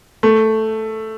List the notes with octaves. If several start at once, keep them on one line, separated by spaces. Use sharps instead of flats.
A3